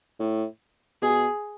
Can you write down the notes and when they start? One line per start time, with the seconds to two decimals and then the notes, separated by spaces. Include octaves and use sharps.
0.20 A2
1.02 B2 G#4